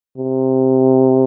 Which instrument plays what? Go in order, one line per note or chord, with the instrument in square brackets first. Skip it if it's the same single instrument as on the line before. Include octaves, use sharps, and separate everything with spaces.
[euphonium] C3